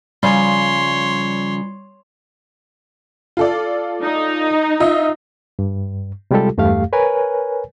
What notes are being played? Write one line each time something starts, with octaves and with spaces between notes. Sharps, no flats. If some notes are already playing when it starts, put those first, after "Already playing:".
C#3 F3 G3 C#5 C6
F4 A4 D5
D#4
F4 D#5 E5
G2
C3 G3 G#3 F4 G4 A4
E2 G2 A3 G4 F5
A#4 B4 C#5 G#5